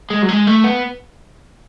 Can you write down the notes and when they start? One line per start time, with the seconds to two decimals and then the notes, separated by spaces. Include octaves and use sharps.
0.10 G#3
0.22 F#3
0.29 G#3
0.47 A3
0.64 B3